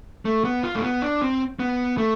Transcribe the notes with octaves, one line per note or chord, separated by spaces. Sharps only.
A3
B3
F4
A3
B3
D4
C4
B3
A3